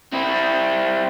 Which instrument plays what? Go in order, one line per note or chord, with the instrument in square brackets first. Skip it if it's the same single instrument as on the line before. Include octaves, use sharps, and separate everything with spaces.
[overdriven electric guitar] C4 E4